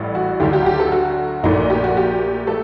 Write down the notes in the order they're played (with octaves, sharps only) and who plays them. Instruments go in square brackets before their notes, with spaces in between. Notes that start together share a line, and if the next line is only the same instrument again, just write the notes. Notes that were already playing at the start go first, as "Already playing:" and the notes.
Already playing: [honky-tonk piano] A1 A2 G3
F#4
D2 D3 F#3 G4
G4
G4
A4
F#4
A#1 A#2 A3 D#4
G4
F#4
G4
A3 A4